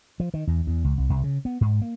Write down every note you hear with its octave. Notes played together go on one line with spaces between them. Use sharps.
F3
D#3
E2
E2
C#2
C2
C2
C#3
B3
G#2
A#3